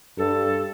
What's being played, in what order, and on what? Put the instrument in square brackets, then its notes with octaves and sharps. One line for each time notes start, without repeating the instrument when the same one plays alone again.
[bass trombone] G2 [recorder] A4